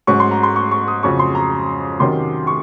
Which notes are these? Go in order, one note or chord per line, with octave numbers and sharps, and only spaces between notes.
G#2 F#3 C#4 C#6
C6
A#5
C6
C#6
C#6
D#6
F2 C#3 F#3 C#6
C6
A#5
C3 D#3 F#3 C#4 C6
C#6